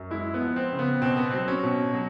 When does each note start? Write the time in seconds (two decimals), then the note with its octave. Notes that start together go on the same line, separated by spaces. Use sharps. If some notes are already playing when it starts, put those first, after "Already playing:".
Already playing: F#2
0.10 G#3 E4
0.34 B3
0.41 F3
0.56 C4
0.72 C#3
0.79 B3
1.02 B2 C4
1.17 B3
1.30 F#3 C4
1.48 C#4
1.63 B2
1.94 F#3